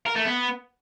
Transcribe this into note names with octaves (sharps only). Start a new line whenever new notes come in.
A#4
A3
B3